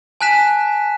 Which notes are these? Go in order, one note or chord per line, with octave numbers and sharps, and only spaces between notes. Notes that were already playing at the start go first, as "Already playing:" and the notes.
G#5 A5 F#6 B6 E7